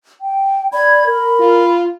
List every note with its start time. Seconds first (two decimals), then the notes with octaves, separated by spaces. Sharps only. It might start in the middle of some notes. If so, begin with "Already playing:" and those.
0.20 G5
0.73 D5 B5 G#6
1.06 A#4
1.40 F4